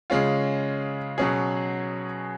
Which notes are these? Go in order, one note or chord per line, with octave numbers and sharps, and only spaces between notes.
C#3 G#3 C#4 F4
B2 F#3 C#4 G#4